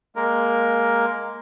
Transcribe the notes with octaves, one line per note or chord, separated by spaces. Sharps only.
G#3 A#3 A#4